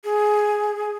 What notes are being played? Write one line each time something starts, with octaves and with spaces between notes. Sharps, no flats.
G#4